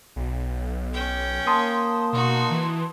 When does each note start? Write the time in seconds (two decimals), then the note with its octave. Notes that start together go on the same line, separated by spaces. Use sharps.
0.16 B1
0.94 C#4 G5
1.47 A#3 A5 C6 D#6
2.13 B2 D#4 F#4
2.50 E3